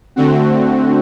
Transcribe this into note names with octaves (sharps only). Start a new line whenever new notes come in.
D3 A3 C4 F#4